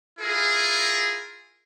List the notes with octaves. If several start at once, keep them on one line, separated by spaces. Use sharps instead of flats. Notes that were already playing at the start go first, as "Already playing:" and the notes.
E4 F4 G#4 A#4